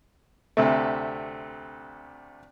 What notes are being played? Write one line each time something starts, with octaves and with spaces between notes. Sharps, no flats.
D2 C3 A3